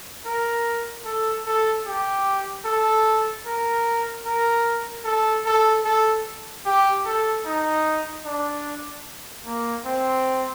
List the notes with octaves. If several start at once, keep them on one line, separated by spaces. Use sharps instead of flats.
A#4
A4
A4
G4
A4
A#4
A#4
A4
A4
A4
G4
A4
D#4
D4
A#3
C4